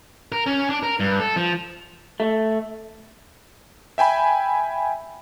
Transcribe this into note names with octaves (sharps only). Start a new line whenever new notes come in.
A#4
C#4
D4
A#4
G2
A4
F3
A3
E5 G5 G#5 B5